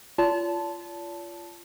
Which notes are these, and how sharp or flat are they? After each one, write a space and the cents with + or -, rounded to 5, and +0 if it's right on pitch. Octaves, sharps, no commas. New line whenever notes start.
F4 -20 D5 -45 A5 +0